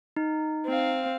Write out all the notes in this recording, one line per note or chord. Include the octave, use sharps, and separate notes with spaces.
D#4
C4 F5